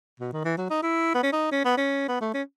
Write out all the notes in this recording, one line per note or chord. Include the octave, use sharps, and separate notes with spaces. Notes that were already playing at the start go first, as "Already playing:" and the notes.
B2
D#3
E3
F#3
D#4
E4
B3
C#4
D#4
C#4
B3
C#4
B3
A3
C#4